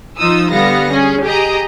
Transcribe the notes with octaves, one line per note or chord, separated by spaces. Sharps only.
F3 D#4 F4 D#6 E6
D3 G3 B3 F5 A#6 C#7
C#4 G#4
G4 G#4 D#5 A#5 D#6